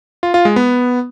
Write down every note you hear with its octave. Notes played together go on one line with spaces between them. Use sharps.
F4
F4
G#3
B3